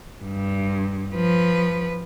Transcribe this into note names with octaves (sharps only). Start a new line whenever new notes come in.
G2
F3 B4